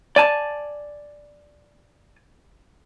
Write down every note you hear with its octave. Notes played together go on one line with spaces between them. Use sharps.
D5 G#5 A5